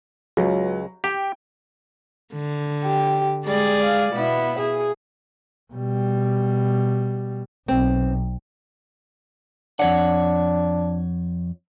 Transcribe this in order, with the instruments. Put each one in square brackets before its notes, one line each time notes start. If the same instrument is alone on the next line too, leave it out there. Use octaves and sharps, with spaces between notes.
[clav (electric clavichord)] C#2 [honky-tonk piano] F#3
[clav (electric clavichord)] G4 [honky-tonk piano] G5
[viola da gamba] D3
[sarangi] G4
[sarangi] G3 [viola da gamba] G#3 G#4 D5
[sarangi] F5
[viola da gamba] B2 E4 [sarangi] B3
[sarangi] G#4
[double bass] B2 G3
[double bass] B1 [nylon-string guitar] C4
[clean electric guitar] F2 C#5 F#5 [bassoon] D4